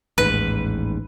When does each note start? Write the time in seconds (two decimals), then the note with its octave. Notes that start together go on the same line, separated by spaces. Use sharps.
0.18 A1 D#2 G#2 B4